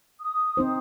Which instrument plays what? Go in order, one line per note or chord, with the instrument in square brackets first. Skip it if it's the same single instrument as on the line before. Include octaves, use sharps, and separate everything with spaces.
[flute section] D#6
[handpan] C4 D#4 C5